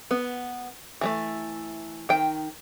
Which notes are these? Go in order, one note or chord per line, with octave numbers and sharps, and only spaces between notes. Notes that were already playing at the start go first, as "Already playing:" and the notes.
B3
E3 G#3 A3
D#3 G5